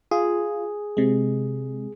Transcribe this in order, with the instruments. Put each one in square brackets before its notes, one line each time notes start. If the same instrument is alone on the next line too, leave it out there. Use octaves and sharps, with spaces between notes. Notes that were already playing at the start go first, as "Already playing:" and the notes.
[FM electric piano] F4 [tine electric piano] G#4
[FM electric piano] C3 G#3